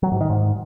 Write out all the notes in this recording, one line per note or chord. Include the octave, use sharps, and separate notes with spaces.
F#3
G#2
D#3
G#2